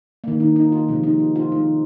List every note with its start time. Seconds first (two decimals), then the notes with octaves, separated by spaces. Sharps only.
0.24 D#3 A#3
0.40 D#4
0.56 D#4
0.72 F4
0.88 C3 F3 G#3
1.03 D#4
1.20 F4
1.36 F4
1.52 D#3 G#3 D#4